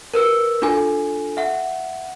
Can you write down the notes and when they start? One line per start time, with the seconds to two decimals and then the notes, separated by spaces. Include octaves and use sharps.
0.14 A#4 B4 E6
0.62 D4 F4 A4 G#5
1.37 E5 F#5